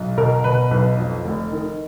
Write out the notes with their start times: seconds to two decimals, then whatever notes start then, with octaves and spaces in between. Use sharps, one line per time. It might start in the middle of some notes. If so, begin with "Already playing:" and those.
Already playing: B1
0.18 B2 A#4
0.44 B2 B4
0.71 B1 B4
0.98 F2
1.25 F1
1.52 D#3